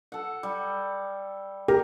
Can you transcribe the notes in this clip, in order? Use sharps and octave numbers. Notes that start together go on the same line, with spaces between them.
A4 F#5
G3
G4 A#4